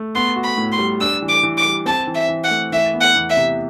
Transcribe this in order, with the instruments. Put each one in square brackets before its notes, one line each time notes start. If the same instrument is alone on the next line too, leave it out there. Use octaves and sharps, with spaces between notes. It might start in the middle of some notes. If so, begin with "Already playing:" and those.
Already playing: [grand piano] A3
[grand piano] B3 [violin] C6
[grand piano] F#4
[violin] B5
[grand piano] A2
[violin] C6
[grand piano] G3
[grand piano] D4 [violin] E6
[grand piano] E3
[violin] D6
[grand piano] E3
[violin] D6
[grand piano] G3
[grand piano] C4 [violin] A5
[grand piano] E3
[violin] E5
[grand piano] E3
[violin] F#5
[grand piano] A3
[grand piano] E3 [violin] E5
[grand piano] B3
[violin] F#5
[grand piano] E2
[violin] E5
[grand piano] C3